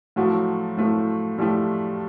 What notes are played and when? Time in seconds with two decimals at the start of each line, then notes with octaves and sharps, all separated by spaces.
0.16 A2 F3 F#3 A3 F#4
0.77 A2 F3 A3
1.38 A2 F3 G3 A3 G4